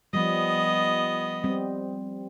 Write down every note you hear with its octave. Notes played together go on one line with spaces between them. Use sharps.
F3 G3 B3 D#5
G3 C4